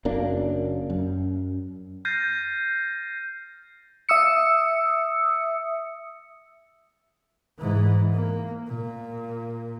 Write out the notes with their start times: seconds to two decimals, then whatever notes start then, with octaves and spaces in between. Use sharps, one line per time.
0.05 F#1 F#2 A#3 D4
0.90 F#2
2.05 F6 G6 A6 A#6 C7 D#7
4.09 E5 D#6 E6 C#7
7.59 G#2 E3
8.13 A#3
8.67 A#2